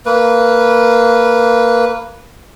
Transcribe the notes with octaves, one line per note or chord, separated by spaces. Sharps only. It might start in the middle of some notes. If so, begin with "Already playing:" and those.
A#3 B4